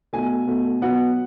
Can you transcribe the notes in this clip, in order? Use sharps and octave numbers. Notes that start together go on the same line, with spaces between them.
B2 A3 G#5
B2 A3
B2 F#3 B3 F#5